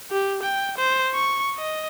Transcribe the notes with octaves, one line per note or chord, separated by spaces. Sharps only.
G4
G5
C5
C#6
D#5